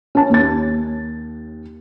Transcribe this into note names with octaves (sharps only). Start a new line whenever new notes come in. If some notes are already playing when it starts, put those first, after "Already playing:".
C#4 A5
D#2 A6